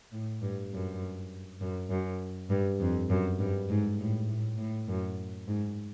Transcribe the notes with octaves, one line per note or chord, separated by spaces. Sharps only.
A2
G2
F#2
F#2
F#2
G2
F2
F#2
G2
G#2
A2
A2
A2
F#2
G#2